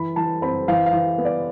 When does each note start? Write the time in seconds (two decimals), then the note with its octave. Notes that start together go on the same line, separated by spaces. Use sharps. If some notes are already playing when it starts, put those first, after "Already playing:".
Already playing: E3 B5
0.16 E3 A5
0.42 C4 B5
0.68 E3 F5
0.86 F5
0.93 E3
1.18 B3
1.25 D5